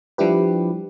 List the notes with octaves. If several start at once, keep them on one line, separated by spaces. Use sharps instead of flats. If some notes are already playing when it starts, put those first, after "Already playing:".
F3 G3 D4 E4 G4 B4